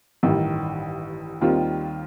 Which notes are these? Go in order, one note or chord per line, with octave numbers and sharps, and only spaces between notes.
A1 G2 D#3
D#2 D#3 G3 C4 F4